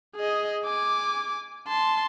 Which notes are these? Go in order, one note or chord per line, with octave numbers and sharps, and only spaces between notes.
G#4 D#5
G#5 D6
A5 C6